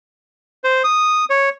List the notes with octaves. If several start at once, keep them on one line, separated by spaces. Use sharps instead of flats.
C5
D#6
C#5